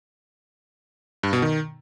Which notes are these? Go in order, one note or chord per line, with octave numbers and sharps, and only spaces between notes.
G2
B2
D#3